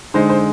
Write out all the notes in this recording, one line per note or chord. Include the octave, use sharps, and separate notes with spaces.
D3 G#3 D#4 C5
C5